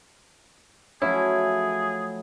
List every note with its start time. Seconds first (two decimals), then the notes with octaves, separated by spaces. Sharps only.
1.02 F3 F#3 A3 C#4 E4 G#4